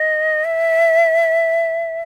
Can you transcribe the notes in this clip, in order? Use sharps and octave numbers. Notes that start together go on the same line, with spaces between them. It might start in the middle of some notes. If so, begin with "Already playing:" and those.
Already playing: D#5
E5